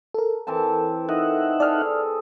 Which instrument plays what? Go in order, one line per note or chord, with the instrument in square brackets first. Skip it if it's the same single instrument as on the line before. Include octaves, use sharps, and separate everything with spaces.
[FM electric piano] A4 A#4
[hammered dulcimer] E3 C4 A5
[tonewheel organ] D#4 E5 F#5 [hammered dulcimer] D#5
[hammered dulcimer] G#4 A4 [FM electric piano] D5 F6